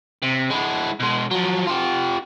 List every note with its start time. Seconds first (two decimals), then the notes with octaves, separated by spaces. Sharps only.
0.22 C3
0.50 G#3 E4
1.00 B2 G#3
1.31 F3 F#3
1.67 F4 G4